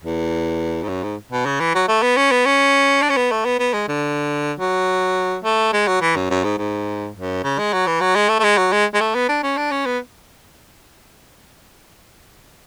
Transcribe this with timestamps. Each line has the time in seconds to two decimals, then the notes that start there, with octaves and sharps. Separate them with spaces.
0.03 E2
0.83 G#2
0.88 F#2
1.03 G#2
1.31 B2
1.45 C#3
1.60 E3
1.75 F#3
1.88 A3
2.02 B3
2.17 C#4
2.31 B3
2.45 C#4
3.02 D4
3.09 C#4
3.17 B3
3.31 A3
3.45 B3
3.59 B3
3.73 G#3
3.88 D3
4.59 F#3
5.44 A3
5.73 G#3
5.87 F#3
6.01 E3
6.16 F#2
6.30 F#2
6.44 G#2
6.58 G#2
7.15 F#2
7.43 C#3
7.58 G#3
7.73 F#3
7.87 E3
8.00 F#3
8.15 G#3
8.29 A3
8.39 A3
8.43 G#3
8.57 F#3
8.72 G#3
8.94 G#3
9.00 A3
9.15 B3
9.29 D4
9.43 C#4
9.57 D4
9.71 C#4
9.85 B3